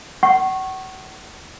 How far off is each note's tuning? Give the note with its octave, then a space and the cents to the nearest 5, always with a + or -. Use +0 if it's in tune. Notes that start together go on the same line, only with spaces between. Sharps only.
F#5 +35 C#6 -20